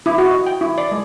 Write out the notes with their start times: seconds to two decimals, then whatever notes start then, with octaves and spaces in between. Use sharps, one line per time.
0.06 E4
0.18 F#4
0.31 D#5
0.47 G5
0.61 E4
0.78 D5
0.91 G#3